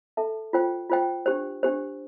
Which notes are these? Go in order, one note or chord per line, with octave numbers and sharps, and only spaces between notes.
A4 E5 A5
F4 C5 G5
F4 C5 G5
D4 G4 C5
D4 G4 C5